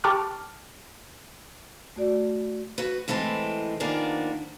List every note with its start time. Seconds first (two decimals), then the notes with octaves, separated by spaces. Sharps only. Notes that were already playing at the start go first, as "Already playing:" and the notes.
0.04 G4 A5 C#6 D6 F6
1.96 A3 F#4 D5
2.78 F#4 B4
3.08 A2 E3 G#3 C4 A5
3.80 D#3 F3 A#3 B3 D4 G#4